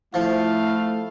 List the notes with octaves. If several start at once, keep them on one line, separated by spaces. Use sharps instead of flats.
F3 A3 E4 F5